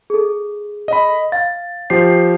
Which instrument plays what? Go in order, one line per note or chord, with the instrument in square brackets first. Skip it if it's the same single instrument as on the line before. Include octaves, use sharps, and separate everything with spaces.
[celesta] G#4 A4
[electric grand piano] D#5 B5
[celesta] F5 [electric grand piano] A6
[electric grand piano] F3 G4 C7